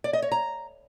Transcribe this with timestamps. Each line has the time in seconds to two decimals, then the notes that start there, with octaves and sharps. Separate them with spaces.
0.04 D5
0.13 D#5
0.22 C#5
0.32 A#5